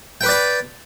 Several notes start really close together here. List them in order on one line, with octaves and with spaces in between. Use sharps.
G5 B4 D6 D5 B5